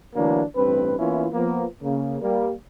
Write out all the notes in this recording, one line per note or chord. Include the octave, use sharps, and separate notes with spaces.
D3 E3 F#3 A3 A#3 D4
A1 G2 C4 B4
E3 A#3 B3 C#4 E4 F4
F3 A#3 B3
C#3 A#3
G3 A#3